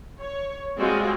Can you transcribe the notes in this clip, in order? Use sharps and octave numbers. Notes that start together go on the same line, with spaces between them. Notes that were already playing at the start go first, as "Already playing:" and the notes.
C#5
G3 G#3 C4 F4 F#4 G#4